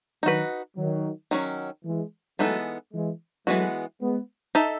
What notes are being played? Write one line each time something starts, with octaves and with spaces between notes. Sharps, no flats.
D#3 F#3 D#4 F#4 B4
D#3 F#3
D#3 F#3 C#4
E3 G#3
E3 F#3 G#3 A3 B3 D#4 A4
E3 G#3
E3 F#3 G#3 A3 B3 F#4
G#3 B3
D#4 A4 E5